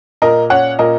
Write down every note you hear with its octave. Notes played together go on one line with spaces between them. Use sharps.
A#2 A#4 D#5
C#4 C#5 F#5
A#2 A#4 D#5